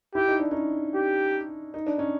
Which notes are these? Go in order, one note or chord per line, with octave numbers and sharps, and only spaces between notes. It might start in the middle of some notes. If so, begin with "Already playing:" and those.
E4 G4
D#4
D4
C#4 D#4
G4
D#4
D4
C#4 D#4